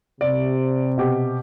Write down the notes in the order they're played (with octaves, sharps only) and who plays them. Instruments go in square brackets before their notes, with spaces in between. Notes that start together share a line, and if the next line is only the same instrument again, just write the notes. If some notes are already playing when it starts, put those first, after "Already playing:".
[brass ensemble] C3 [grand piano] D5
[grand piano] B2 G4